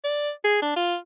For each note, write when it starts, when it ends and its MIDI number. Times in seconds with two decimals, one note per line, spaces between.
0.04 0.30 74
0.44 0.60 68
0.62 0.76 62
0.76 0.97 65